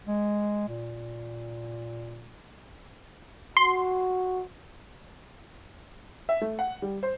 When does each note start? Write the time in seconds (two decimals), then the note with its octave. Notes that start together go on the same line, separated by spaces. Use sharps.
0.07 G#3
0.68 A#2
3.57 F#4 C6
6.29 E5
6.41 A3
6.59 F#5
6.82 G3
7.03 C5